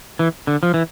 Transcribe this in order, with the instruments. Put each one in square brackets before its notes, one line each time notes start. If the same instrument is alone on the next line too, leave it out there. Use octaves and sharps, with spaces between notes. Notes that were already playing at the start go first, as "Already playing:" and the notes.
[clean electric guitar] E3
D3
F3
E3